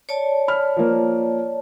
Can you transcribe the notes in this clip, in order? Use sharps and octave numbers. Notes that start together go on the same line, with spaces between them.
C#5 D5 A5
B5 F6
F3 A#3